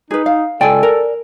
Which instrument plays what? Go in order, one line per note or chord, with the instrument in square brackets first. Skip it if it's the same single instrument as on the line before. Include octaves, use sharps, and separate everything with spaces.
[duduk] D#4 [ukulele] G#4 B4
[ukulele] F5
[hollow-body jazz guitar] C#2 G5 [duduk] A4 [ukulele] D5 G#5
[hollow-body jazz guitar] A#4